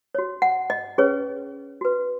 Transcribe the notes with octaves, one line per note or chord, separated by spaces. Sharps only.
F#4 C#5
F#5
D#5
C#4 G#4 B4 C#5
F#4 B4